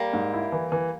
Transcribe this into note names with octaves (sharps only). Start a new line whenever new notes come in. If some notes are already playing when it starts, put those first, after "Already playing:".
Already playing: G3 A#3
G#2
E4
E3
E3